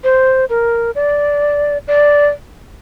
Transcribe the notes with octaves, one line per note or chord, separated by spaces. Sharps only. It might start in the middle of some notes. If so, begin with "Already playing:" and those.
C5
A#4
D5
D5